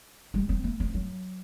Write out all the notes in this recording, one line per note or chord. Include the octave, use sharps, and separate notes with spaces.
G3
C4
A#3
C4
F#3